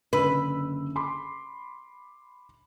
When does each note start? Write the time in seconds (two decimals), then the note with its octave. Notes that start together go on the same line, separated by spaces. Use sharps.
0.13 F#1 D3 B4 E6
0.96 B5 C6 D6